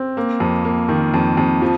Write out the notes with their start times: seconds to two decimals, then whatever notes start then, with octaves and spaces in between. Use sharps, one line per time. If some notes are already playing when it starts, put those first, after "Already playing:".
Already playing: C4
0.17 A#3
0.40 F2
0.65 A#3
0.89 D#3
1.14 F2
1.37 F2
1.62 F3